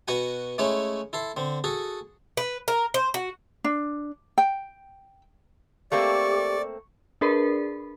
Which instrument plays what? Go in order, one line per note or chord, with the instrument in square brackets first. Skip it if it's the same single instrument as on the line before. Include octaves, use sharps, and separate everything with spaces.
[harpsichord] B2 F#4 B4 F#5 G#5
G#3 A3 C#4 E4 C#5
E4 A4 C6
D3 C4
F#4 G#4 A4
[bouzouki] B4
A#4
C5
F#4
[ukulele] D4
G5
[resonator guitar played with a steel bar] A3 A#3 C4 [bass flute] G4 [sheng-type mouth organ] D5 [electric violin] C#6
[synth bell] D4 G#4 A#4 B4 D5 B5